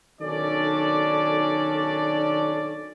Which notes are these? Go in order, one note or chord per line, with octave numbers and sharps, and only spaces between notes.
B1 D#3 C#4 D4 A4 D5